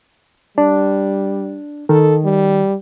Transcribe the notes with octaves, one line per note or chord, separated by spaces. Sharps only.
G3 D4
D#3 A4
G3